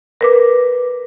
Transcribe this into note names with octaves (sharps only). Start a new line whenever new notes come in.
A#4 B4 D6